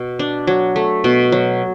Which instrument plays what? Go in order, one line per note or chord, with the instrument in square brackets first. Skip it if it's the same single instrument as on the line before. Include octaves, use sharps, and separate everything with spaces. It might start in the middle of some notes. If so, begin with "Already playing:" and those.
Already playing: [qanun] B2
D4
F#3
A3
B2
F#3